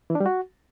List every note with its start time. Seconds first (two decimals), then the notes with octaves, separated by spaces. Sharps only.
0.10 E3
0.15 D4
0.20 G3
0.26 F#4